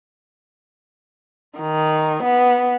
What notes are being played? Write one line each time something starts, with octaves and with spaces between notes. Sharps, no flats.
D#3
B3